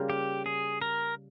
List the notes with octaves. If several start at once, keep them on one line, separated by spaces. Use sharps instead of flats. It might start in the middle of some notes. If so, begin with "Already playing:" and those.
Already playing: C#3 G3 A#3 F4
G4
G#4
A#4